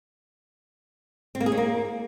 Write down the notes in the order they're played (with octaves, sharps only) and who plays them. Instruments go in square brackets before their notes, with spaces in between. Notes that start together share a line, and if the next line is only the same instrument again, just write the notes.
[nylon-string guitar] C4
A#3
G#4
C#4
A#3